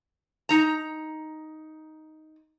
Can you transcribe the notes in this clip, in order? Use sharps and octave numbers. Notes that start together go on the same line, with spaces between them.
D#4 A#5